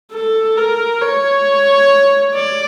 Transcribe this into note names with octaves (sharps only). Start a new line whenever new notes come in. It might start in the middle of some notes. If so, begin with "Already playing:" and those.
A4
A#4
C#5
D5